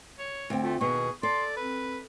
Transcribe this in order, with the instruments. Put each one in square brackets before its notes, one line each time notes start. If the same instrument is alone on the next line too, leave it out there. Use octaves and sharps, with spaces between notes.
[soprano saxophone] C#5
[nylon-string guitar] D2 C4
[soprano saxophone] A3 [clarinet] F4
[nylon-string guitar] D#2 B2 [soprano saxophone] G#4 [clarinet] C#6
[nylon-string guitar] A4 [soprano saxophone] D5 [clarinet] C6
[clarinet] C4 [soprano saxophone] B4